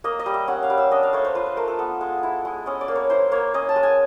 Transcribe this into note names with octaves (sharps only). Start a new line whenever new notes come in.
A#3 D#5
D#5
G3
E5
C#4 F#5
F5
G3
E5
D4 D#5
F5
A3 C#5
C5
F4 B4
C5
A3 A#4
A4
B3 A4
G#3
E4
G#3
C#4 D#5
D5
A#3
C#5
E4 C5
A#3 C#5
C#4 D#5
A5
G#3
G#5